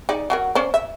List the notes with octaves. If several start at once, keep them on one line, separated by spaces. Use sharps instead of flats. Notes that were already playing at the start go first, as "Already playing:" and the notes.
D#4 G#4 D5
F#3 F#4 A#4
C#4 C5 D5
E5